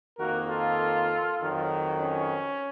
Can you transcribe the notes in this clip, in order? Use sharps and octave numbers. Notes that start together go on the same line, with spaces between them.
F2 D#3 A#3 F#4 A#4
F4 A4
F2 D#3 F#3
C#4